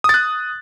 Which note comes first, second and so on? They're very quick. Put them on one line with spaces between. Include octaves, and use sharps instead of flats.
D#6 A6 F#6